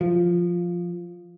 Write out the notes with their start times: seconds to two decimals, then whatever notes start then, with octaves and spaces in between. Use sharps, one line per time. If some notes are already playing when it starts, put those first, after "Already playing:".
0.01 F3